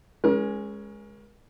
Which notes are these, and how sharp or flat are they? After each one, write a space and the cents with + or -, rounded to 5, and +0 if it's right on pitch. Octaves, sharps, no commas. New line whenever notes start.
G#3 +0 C#4 +0 A#4 +35